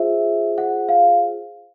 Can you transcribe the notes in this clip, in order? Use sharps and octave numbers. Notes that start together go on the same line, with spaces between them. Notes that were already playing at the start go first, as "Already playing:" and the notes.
Already playing: F4 G#4 C5 E5
F#5
F5